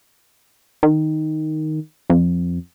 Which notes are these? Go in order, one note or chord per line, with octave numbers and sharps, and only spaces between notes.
D#3
F2